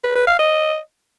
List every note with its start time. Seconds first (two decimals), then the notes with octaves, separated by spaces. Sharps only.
0.04 B4
0.15 B4
0.27 F5
0.39 D#5